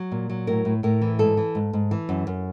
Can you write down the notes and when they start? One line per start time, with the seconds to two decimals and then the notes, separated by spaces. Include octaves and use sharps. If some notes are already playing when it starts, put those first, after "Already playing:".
Already playing: F#3
0.11 A#2
0.29 F#3
0.47 A2 A#4
0.65 A2
0.83 A2 A#4
1.01 E3
1.19 G#2 A4
1.37 E3
1.55 G#2
1.73 G#2
1.91 E3
2.09 F#2
2.27 F#2